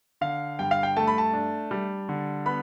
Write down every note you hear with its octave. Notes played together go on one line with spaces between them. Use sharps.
D3 F5
G2 G5
F5
G5
A3 A5
B5
A5
D4
G3
D3
B3 B5